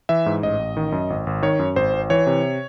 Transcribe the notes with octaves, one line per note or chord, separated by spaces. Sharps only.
E3 E5
G#2
A1 D#5
A1
D#3
F#2
G#1
G#1
D#3 C#5
F#2
G#1 C5
G#1
E3 C#5
C3